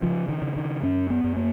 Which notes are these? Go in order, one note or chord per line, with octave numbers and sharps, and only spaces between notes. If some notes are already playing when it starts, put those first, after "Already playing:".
C#3 F3
D#3
C#3
D#3
F#2 C#4
B3
F#2
A#3